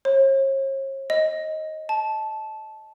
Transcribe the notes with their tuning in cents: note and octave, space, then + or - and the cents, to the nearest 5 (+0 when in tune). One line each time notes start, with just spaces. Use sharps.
C#5 -45
D#5 +10
A5 -15